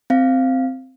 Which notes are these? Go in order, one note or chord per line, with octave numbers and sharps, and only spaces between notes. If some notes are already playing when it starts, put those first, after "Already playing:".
C4 F5